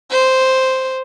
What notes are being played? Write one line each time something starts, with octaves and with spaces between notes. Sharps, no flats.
C5